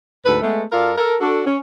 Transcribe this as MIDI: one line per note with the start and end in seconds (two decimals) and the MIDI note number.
0.25 0.37 38
0.25 0.37 44
0.25 0.37 69
0.25 0.37 71
0.41 0.63 56
0.41 0.63 57
0.41 0.63 59
0.71 0.92 42
0.71 0.92 65
0.71 0.92 69
0.71 0.92 70
0.71 0.92 74
0.71 0.92 77
0.97 1.15 69
0.97 1.15 70
1.20 1.45 62
1.20 1.45 66
1.20 1.45 69
1.46 1.58 61